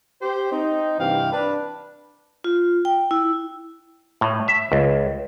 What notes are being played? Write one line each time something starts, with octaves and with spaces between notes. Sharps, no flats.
G4 C5
C4 D#4
G2 C3 E3 F5 G5
D4 B4
F4
G5
E4
A2
E5
C#2